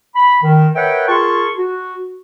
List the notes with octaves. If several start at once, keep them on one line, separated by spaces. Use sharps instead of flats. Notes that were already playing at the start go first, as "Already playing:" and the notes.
B5
D#3
A#4 B4 C#5 E5 F#5 G5
F4 G#4 A#4 A5 C6 C#6
F#4